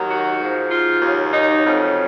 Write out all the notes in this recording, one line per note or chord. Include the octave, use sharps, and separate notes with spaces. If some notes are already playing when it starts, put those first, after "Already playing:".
Already playing: D#2 D#3 F#3
F#4
G#2 F3
F4
D#2 C#3 F#3
D#4
F2 C#3 F#3